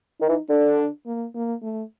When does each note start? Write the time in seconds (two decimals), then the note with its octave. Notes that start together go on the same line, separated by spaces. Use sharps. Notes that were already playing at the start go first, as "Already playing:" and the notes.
0.20 D#3 D#4
0.29 E3
0.49 D3 D4
1.06 A#3
1.35 A#3
1.63 A3